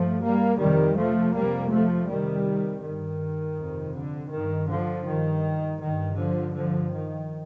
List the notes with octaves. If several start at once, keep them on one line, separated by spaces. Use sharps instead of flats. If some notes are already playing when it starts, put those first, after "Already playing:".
Already playing: G2 F3 A3
G3 A#3
F2 C3 D#3 G3
F3 A3
F2 C3 G3 A#3
F3 A3
F2 C3 D#3 G3
G2 D#3
F2 C3
D3
G2 D#3
D3 F3
G2 D#3
G2 D#3
D3 F3
G2 D3 F3
D#3